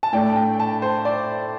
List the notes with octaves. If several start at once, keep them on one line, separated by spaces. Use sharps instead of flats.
A5
A2 A3 D4 G5
G5
A5
C5
D5